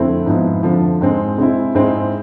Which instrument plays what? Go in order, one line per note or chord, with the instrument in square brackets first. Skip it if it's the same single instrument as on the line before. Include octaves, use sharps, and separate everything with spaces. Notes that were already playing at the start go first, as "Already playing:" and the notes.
Already playing: [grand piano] F2 D3 A3 C4 E4
G#2 F3 B3 E4
F2 D3 F3
G#2 G#3 C4
C3 G#3 C4 E4
G#2 G#3 C4 E4